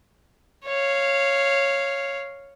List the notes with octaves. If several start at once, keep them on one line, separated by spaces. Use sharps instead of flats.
C#5 F5